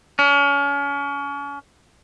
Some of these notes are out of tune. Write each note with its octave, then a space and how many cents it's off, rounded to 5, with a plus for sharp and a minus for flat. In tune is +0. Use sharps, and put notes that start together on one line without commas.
C#4 +35